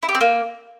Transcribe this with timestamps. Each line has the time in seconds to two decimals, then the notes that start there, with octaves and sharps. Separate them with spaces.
0.03 E4
0.09 G4
0.15 C4
0.21 A#3